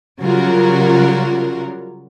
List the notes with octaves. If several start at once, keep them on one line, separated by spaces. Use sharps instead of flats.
C#3 F#3 G3 F4 F#4 A#4